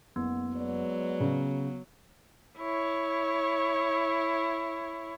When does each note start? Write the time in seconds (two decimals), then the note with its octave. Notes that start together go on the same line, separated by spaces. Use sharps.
0.16 F#1 B3
0.56 F#3 G#3 B4 D5
1.20 C#3
2.58 E4 C#5